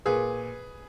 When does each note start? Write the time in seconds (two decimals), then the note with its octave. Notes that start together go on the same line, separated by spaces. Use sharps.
0.05 A#2 G#4 B4